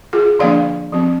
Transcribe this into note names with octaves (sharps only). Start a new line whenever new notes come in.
F4 G#4
D3 F3 A#3 D4 D5 F5
F3 C4